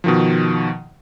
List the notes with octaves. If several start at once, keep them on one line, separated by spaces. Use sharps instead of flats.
B2 D#3 F3